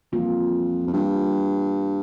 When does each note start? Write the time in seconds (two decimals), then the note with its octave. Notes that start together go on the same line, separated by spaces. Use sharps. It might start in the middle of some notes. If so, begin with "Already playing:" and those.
0.12 F2 E3 G3 A#3 F4
0.87 F2
0.93 G2 E3 G3 A#3 F4